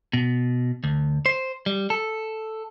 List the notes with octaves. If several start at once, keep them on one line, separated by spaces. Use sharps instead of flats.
B2
D2
C5
G3
A4